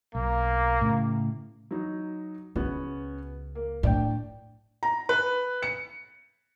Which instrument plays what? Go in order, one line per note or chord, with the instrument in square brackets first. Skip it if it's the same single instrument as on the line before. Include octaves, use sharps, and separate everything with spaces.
[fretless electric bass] B1 [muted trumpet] A#3
[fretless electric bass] A2 C#3
[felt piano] F#3 D#4
[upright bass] C#2 [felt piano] B3 C#4 F#4
[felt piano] A#3
[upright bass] A2 [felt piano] D4 D5 G5
[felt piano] A#5
B4
C#7